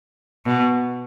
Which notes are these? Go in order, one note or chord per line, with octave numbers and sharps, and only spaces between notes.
B2